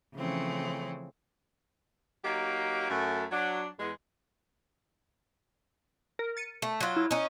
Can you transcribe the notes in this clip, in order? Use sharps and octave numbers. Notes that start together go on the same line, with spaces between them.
C#3 E3 F3 A3 C4 C#4
F#3 A#3 D#4 G4
F#2 A3
F#3 D4
E2 G#3
A#4
A6 C#7 D#7
A3
F#3 F4
E4
C#4 D#4